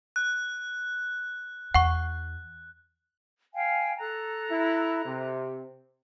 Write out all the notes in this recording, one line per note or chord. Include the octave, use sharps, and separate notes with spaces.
F#6
E2 F#5 C#6
F5 G5 G#5
A4 A#5 F#6
E4
C3